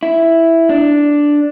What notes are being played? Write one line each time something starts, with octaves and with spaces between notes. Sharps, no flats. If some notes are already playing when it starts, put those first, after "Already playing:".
E4
D4